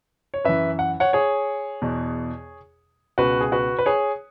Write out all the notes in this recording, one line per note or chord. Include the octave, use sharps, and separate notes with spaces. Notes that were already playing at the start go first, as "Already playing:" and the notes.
C#5
F#2 E3 B4 E5
F#5
C#5 F#5
G#4 C#5
E2 B2
C#2 B2 F#4 B4
G#4
F#4 B4
B4
G#4 C#5